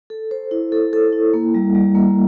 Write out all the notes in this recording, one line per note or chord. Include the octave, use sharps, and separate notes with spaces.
A4
C5
E4
A4
A4
E4
A#3
G3
G3
A#3